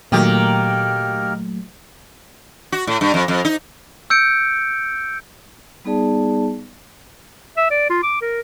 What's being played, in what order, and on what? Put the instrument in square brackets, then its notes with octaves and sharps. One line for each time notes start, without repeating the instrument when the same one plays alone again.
[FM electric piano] A#2 F#3 A3 [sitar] D#3 G4 [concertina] A#3 A#4
[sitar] F#4
A2
G2
F2
F2
D#4
[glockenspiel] E6 G6 C#7 D7
[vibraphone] G3 B3 D#4 G#4 D5 A5
[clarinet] E5
D5
F4
D6
A#4